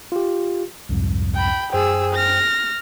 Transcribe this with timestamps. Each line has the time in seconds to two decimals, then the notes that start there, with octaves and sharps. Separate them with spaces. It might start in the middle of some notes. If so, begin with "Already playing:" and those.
0.12 F4 G4
0.89 C2 F2 G#2
1.34 G5 B5
1.72 F#2 G#4 C5 G5 E6
2.13 F6 A#6